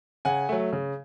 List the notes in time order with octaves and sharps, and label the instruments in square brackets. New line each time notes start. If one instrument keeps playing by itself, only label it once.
[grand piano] C#3 F#5 G#5
F#3 A3
C#3